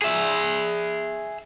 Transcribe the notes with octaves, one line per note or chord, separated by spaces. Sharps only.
G#4 E5